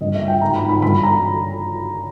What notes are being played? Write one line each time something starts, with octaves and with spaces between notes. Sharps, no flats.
G2 D#5
E5
G3
G5
G#2 A#5
B5
G#2
B5
G2 B5
A#5